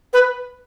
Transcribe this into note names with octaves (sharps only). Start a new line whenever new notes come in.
B4